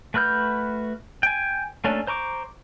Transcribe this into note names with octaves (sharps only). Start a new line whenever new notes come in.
A3 F#4 B4 F6 G6
G5 G#5
A3 A#3 C#4 D4 A4
C5 A#5 C#6 D6